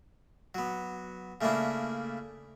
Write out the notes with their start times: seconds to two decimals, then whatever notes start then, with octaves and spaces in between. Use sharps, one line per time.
0.55 F#3 B3
1.41 C#3 A3 A#3 D4 E4